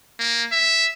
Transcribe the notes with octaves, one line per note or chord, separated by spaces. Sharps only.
A#3
E5